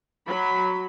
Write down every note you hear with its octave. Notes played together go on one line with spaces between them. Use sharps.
F#3 B5